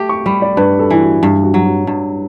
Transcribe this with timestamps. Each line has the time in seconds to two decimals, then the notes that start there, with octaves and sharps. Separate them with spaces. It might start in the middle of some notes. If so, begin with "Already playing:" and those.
Already playing: A3 G4
0.09 C#6
0.26 G3 B5
0.42 D5
0.57 G2 B4
0.79 A4
0.90 E3 E4
1.01 F#4
1.23 G2
1.43 F#4
1.54 F#3
1.66 F#4
1.87 G2